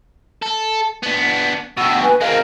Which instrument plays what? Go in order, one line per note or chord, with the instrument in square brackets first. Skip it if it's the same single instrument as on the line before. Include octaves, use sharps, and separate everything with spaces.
[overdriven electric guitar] A4
B3 D4
[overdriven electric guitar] G2 B2 [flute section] F#5 E6
[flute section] B4 G#5
[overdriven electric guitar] G#3 C4 [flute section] A#4 F5